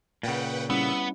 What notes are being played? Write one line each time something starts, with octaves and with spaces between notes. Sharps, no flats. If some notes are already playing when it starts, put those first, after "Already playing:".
A#2 C#3 B4 F#5 G5
G3 B3 C#4 E4 E6